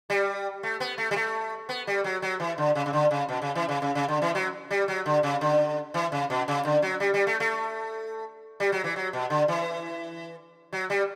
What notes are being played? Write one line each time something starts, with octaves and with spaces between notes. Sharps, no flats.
G3
A3
B3
A3
G3
A3
B3
G3
F#3
F#3
E3
D3
C#3
C#3
D3
C#3
B2
C#3
E3
C#3
C#3
C#3
D3
E3
F#3
G3
F#3
D3
C#3
D3
E3
C#3
B2
C#3
D3
F#3
G3
G3
A3
A3
G3
F#3
E3
F#3
B2
D3
E3
F#3
G3